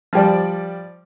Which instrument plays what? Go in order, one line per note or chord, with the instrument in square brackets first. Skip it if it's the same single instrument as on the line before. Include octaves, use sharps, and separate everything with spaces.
[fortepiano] F3 G3 D5